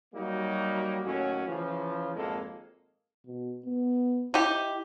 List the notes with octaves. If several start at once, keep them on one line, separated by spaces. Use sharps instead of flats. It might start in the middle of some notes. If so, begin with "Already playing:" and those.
F#3 G3 A#3 D#4 F#4
D#2 A2 F#3 C#4 F#4
C#3 E3 F3
G#1 F2 G#3 A#3 A4
B2
B3
D#4 E4 G4